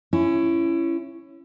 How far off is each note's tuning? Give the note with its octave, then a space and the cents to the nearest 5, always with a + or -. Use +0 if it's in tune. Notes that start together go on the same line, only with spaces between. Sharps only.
C#4 +0 E4 +25